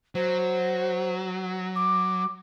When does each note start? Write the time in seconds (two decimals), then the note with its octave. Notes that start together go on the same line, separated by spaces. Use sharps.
0.15 F#3 C5
1.76 D6